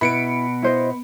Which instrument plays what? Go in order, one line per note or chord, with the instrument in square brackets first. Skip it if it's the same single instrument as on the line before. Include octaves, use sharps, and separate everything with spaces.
[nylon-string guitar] B2 [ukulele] E4 [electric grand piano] B5 C#7 D7
[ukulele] E4 C5 D#5